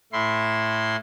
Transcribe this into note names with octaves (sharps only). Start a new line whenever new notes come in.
A2 E4 C6